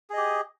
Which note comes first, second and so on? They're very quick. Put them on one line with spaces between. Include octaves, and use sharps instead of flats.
G#4 D#5 G4